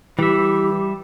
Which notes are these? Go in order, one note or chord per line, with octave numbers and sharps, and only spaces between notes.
E3 G3 G4 E5